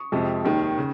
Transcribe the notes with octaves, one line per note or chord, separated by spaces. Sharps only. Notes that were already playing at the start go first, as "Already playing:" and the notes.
Already playing: C#6 D#6
F2 C3 F3 G#3
D#2 D#3 G3
C#3